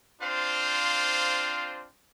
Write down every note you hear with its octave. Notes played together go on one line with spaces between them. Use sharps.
C4 D4 F4 C5 F5